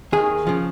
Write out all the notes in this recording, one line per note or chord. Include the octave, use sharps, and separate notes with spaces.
D#2 D#3 G#4
C#3 F3